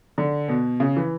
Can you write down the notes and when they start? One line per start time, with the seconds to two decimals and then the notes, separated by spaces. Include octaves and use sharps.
0.18 D3
0.48 B2
0.80 C#3
0.97 E3